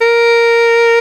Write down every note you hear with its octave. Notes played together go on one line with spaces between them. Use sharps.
A#4